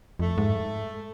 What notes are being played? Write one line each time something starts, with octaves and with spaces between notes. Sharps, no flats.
F2 A3
G#2